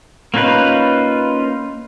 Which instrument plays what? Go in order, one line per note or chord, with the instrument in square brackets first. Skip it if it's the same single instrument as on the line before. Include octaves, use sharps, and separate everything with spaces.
[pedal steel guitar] A#3 C#4 D#4 F4 B4